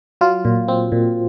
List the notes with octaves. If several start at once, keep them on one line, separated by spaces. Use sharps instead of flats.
F#3 F4
A#2
C4
A#2